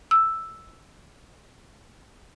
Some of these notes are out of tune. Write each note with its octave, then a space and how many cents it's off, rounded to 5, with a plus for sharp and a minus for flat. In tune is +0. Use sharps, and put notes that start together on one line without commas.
E6 +0